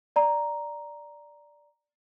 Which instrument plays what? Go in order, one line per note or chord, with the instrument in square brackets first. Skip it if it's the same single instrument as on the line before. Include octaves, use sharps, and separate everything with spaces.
[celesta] D5 A#5